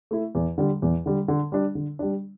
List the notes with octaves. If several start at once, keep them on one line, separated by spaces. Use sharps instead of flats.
A3 E4
E2
D3 G3
E2
D3 G3
D3
G3 D4
D3
G3 D4